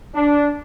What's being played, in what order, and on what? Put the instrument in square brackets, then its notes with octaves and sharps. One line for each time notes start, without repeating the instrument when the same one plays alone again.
[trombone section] D4